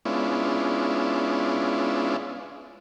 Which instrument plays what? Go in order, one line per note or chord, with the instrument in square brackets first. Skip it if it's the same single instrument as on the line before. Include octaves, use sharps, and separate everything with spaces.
[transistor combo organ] G#3 B3 C#4 D4 E4 F4